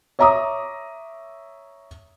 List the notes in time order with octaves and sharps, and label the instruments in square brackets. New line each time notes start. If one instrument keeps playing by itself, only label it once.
[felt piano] C#5 E5 A#5 D6 D#6